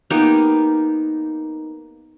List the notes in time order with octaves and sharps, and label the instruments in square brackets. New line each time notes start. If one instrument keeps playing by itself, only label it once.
[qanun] A#3 B3 D#4 G4